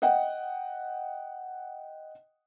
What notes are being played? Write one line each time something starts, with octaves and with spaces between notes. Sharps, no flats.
D#5 F#5 G5